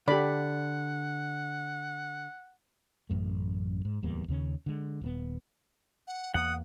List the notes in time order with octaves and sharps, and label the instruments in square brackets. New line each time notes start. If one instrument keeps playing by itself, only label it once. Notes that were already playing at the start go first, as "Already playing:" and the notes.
[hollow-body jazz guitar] D3 [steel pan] G4 A4 B5 [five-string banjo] D5 [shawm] F#5
[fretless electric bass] A1 F#2 A3
G#2
D1 E2 G3 A#3
D#2 C#3 C#4
D3 G#3
D#1 C3 B3
[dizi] F#5
[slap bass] E2 A#3 [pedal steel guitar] F#5 [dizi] D#6